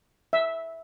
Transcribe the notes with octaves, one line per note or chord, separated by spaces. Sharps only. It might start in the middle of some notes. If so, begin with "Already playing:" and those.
E5